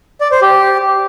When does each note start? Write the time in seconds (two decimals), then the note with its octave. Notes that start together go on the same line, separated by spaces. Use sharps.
0.21 D5
0.31 C5
0.42 G4